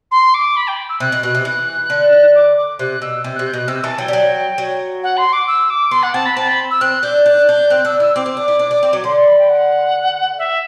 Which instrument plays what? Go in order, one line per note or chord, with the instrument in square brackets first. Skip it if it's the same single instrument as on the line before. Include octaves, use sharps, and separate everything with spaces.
[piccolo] C6
D6
B5
G5
E6
[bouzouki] C3 [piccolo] F#6
[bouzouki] B2
[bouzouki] B2 [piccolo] F#6
[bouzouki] C3
[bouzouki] E3 [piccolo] F#6
[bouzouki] D3
[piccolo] D6
D6
[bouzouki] C3 [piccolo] F#6
[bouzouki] B2 [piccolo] E6
[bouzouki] C3
[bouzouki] C3 [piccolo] F#6
[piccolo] G6
[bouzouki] B2 [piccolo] F#6
[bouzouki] C3 [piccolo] E6
[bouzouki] E3 [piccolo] A5
[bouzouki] F#3 [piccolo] G5
[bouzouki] G3
F#3
F#3
[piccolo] F#5
C6
D6
E6
D6
[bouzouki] B3 [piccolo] C6
[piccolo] F#5
[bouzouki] C4 [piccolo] A5
[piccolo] B5
[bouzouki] C4 [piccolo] A5
[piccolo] B5
E6
[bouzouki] C4 [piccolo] F#6
[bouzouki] D4 [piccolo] G6
[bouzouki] D4 [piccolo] F#6
[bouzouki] D4 [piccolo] G6
[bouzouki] C4 [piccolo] F#6
[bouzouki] D4 [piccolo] E6
[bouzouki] E4 [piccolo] E6
[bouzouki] C4 [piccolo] D6
[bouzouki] C4
D4
E4
D4
D4
C4
F#3
[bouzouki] D3 [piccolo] C6
[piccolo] C6
B5
G5
F#5
E5